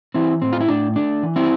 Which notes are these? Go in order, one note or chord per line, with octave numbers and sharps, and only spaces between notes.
E3 C4 E4
A2 C4
F4
E4
A2 D4
A3 D4
E3
C4 E4